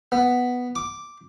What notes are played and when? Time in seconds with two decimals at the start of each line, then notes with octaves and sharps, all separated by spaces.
0.12 B3
0.75 D6